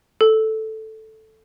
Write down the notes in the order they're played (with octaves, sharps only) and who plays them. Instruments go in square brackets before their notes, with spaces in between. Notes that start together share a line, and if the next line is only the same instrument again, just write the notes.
[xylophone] A4